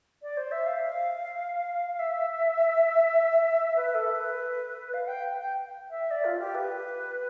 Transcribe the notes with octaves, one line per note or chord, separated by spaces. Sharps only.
D5
C5
E5
F5
E5
B4
A4
B4
F5
G5
G5
E5
D5
F4
G4
B4